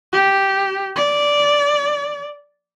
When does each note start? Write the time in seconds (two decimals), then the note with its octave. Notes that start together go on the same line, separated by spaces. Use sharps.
0.13 G4
0.96 D5